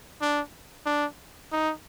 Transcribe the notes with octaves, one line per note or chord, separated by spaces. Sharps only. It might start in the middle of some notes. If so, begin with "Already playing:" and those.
D4
D4
D#4